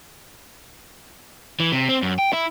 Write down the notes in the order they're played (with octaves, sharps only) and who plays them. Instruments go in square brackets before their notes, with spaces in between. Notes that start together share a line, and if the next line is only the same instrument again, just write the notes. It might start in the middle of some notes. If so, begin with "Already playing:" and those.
[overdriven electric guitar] E3
C3
C4
F#2
G5
E4